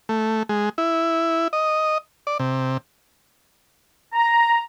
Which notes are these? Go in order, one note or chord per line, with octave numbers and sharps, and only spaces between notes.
A3
G#3
E4
D#5
D5
C3
A#5